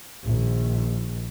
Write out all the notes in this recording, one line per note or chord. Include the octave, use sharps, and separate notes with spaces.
A#1 D#3